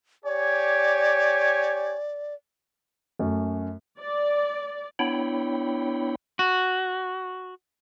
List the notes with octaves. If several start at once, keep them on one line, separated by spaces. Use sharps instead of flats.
G4 C#5 D5 G#5
F#2 A3
D5
B3 D4 E4 C#5 G5 B5
F#4